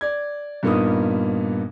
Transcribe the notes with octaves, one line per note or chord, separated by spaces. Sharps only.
D5 G#6
G2 A#2 A#3 B3 D#4 D#6